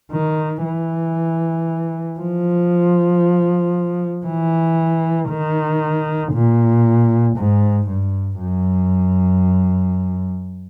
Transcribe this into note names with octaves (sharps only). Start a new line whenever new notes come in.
D#3
E3
F3
E3
D#3
A#2
G#2
G2
F#2